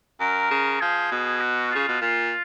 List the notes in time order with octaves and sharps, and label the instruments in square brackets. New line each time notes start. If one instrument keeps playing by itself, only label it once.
[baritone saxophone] F#2 [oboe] A#4
[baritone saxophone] C#3
[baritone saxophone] F3 [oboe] G#4
[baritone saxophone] B2
[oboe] F#4
[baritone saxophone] C#3 [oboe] F4
[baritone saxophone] B2
[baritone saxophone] A#2 [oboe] F4